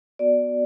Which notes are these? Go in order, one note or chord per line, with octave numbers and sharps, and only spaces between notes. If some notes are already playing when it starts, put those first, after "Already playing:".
B3 F#4 D5